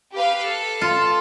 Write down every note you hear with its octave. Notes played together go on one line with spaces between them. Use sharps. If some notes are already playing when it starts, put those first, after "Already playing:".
G4 B4 F5
A4
F4